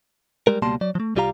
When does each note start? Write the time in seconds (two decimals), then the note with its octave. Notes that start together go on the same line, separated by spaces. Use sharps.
0.47 G3 G#3 A#4
0.62 C#2 B2 G3 A#3 A5 C6
0.81 F#3 D5
0.95 F3 A3
1.16 C2 G3 F4 G4 F5 A#5